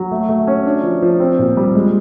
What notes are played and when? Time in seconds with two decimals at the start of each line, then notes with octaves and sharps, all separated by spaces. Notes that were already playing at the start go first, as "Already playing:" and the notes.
Already playing: F#3
0.11 A3
0.29 A3
0.47 C#4
0.65 D4
0.83 F3
1.02 F3
1.20 C4
1.39 A#2
1.57 G3
1.75 G#3